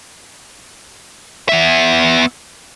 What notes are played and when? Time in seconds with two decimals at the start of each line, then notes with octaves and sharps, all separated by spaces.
1.49 B3 E5